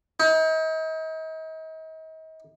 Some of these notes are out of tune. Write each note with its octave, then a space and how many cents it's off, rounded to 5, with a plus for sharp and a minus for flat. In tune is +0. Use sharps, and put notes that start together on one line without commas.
D#4 +40